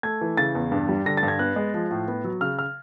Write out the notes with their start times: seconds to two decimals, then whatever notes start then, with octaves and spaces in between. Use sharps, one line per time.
0.03 A3 G#6
0.21 E3
0.37 C#3 A6
0.55 E2
0.72 G2
0.89 G3
1.06 D3 A#6
1.17 A6
1.23 G2
1.28 G#6
1.39 B3 F#6
1.56 G#3
1.74 F3
1.91 A2
2.08 B3
2.24 F#3
2.41 C#3 F6
2.59 F6